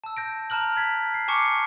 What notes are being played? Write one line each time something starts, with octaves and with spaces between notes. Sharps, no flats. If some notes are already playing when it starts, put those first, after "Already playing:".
A5 E6
G6 A#6 D7
A5 A#5 F6 F#6 F#7
G#6 B6
C7
G#5 A5 C#6 D6 C#7